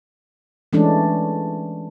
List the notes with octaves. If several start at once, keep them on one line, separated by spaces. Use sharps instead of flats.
E3 G#3 A3 C#4 D4